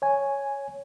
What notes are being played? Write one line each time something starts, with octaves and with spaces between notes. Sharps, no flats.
C#5 G#5